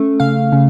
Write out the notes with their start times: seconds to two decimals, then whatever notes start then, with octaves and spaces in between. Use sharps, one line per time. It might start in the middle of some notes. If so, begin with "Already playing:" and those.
Already playing: A3 C#4
0.20 C#3 F5
0.52 C#3